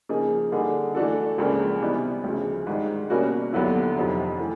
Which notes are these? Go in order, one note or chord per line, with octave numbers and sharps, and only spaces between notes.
C#3 F3 A#3 D#4 G#4
D3 G3 A#3 D#4 G#4
E3 A3 D4 F#4 A4
C#2 C#3 F3 A#3 D4
C3 E3 G3 B3 D#4
D2 C#3 F3
G#2 D#3 G3
B2 G3 A#3 C#4 F#4
D#2 D3 F#3 B3 E4
F2 C3 D#3 F#3
E3 A3